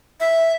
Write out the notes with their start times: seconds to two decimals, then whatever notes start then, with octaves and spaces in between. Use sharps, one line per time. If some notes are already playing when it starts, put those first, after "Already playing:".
0.20 E5